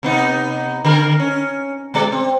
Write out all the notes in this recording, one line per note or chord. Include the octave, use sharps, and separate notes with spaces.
C3 B3 D#4
D3 A#4
C#4
B2 G#3 D5
C4